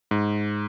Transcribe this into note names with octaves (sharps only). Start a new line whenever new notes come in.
G#2